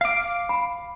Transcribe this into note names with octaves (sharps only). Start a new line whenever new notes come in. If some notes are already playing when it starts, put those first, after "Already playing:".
F5 D6
B5